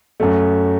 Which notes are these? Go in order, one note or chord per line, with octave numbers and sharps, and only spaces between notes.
F#2 F#3 A3